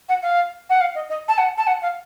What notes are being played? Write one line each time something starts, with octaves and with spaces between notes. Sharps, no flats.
F#5
F5
F#5
F5
D#5
D#5
A5
F#5
A5
F#5
F5